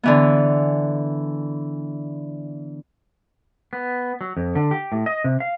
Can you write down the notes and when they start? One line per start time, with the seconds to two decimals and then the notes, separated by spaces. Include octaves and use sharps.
0.03 D3 E3 B3
3.73 B3
4.21 F#3
4.37 F2
4.55 D3
4.71 G4
4.92 A2
5.06 D#5
5.24 C3
5.40 F5